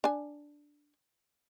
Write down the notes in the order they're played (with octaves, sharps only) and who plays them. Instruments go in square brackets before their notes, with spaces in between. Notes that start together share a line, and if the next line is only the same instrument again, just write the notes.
[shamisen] D4 G#5